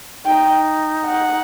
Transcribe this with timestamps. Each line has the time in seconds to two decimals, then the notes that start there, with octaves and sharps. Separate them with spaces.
0.25 D#4 G5
1.06 F#5